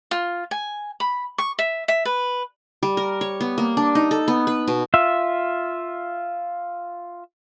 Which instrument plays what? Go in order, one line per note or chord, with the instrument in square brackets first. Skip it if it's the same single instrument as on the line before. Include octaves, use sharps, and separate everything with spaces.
[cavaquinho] F4
G#5
B5
C#6
E5
E5
B4
[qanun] G3
A#4
C#5
B3
A#3
D4
D#4
A4
B3
B4
B2
[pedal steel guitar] F4 E5